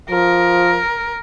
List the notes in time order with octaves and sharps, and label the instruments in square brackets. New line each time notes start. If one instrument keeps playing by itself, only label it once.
[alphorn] F3 [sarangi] A#4